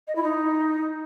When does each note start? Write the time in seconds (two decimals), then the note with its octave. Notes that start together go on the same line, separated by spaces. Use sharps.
0.07 D#5
0.15 E4
0.23 D#4